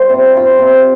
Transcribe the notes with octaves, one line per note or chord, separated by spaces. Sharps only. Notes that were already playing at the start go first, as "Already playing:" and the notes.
Already playing: G3 F4 C5
C3
G3 F4 C5
C3